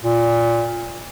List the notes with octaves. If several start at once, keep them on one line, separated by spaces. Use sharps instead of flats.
A#2